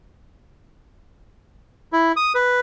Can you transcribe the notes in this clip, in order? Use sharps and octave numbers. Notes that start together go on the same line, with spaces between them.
E4
D#6
B4